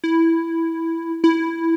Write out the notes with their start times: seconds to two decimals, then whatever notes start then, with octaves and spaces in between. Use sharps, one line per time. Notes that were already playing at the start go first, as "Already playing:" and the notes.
0.04 E4
1.24 E4